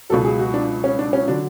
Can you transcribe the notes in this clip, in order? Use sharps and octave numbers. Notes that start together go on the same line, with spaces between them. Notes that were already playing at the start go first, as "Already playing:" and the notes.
C#2 B2 F#3 A4
G#4
F#4
D4
C#4
D4
C#4
D3 F#3 D4